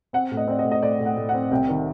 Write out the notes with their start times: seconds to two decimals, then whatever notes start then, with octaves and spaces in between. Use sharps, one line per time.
0.13 C4 F#5
0.31 A2
0.37 D#5
0.47 C4 D5
0.59 D#5
0.65 A2
0.71 D#5
0.82 A2 D5
1.00 A2
1.06 F#5
1.17 A2
1.29 F#5
1.34 C4
1.51 C2 G5
1.69 D#3